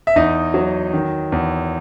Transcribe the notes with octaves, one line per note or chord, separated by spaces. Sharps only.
E5
E2 D#4 D#5
F#3
D#3
E2